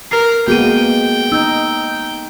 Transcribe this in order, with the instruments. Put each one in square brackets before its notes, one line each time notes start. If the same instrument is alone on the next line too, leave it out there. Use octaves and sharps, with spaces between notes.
[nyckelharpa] A#4 [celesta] C7
[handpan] G#3 A#3 B3 [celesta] F#4 G#4 D#7 [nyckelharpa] G5
[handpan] D#4 [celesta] E6 G6